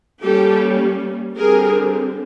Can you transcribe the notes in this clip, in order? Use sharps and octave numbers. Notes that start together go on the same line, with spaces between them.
G3 A#3 C#4 G4 A4
D3 G3 C4 G#4 A#4